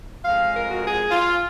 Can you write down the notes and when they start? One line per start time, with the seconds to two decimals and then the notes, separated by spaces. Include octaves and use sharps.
0.25 F2 F3 G#3 F5
0.53 A#4
0.71 F#4
0.83 G#4
1.11 F4